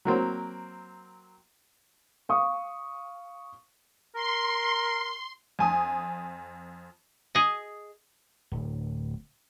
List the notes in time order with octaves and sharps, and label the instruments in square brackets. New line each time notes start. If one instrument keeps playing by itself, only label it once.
[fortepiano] F#3 A#3 C4
[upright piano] F5 C#6 D#6
[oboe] A#4 [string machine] C6
[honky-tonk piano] F2 G#5 D#6
[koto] G#4 D#5
[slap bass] D1